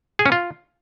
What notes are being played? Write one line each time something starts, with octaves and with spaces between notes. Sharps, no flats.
G#4
C#4
F4